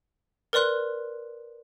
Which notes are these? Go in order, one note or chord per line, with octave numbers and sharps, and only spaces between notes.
A#4 B4 D5 C6 F#6